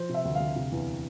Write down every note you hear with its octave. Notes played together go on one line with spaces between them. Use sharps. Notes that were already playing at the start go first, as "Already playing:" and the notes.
Already playing: F3 C5
C3
E5
D2
F5
D2
C3
E2